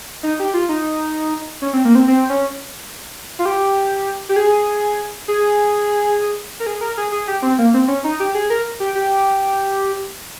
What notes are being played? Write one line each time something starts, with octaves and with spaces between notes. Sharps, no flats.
D#4
G4
F4
D#4
C#4
C4
A#3
C4
C4
C#4
F4
G4
G4
G#4
G#4
A#4
G#4
A#4
G#4
G#4
G4
C4
A#3
C4
C#4
D#4
G4
G#4
A#4
G4
G4